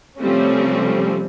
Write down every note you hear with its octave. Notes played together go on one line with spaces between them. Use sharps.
C3 F3 G3 A3 C4 C#4